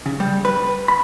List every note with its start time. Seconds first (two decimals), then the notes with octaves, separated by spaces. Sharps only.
0.06 C#3
0.20 G3
0.45 B4
0.88 B5